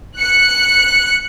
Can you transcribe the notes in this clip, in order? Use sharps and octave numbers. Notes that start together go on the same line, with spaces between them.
F#6 C#7